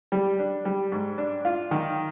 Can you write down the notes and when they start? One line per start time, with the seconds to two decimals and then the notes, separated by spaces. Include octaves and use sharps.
0.12 G3
0.39 D4
0.65 G3
0.92 G#2
1.18 D4
1.45 F4
1.71 D#3